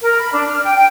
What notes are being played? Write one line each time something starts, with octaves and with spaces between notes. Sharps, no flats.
A#4
B5
D4
F6
G5
G5